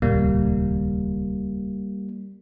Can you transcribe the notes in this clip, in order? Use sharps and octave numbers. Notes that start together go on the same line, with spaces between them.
D#1 C#2 A#2 G3 A#3